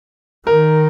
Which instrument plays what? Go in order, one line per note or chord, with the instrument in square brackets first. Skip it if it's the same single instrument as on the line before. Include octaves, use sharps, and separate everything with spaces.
[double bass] D#3 [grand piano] A#4